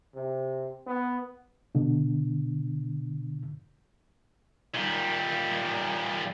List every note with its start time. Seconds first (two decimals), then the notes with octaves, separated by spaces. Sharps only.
0.15 C3
0.87 B3
1.75 B2 D3
4.74 A#2 G3